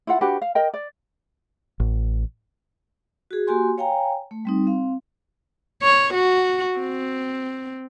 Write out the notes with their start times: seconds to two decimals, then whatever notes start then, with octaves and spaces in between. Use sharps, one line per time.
0.07 E4 F4 F#5
0.21 D4 F#4 G4 B4
0.42 F5
0.55 A#4 D#5 G5
0.74 D5
1.80 A1
3.31 F#4 G#4
3.47 A#3 F#4 G4 G#5 C6
3.78 C#5 F5 G5 G#5 A#5
4.31 A3
4.45 G3 C4 D#4
4.67 C4 F5
5.82 C#5
6.14 F#4
6.79 C4